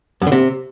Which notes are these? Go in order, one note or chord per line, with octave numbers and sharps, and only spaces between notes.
F#2
D3
C3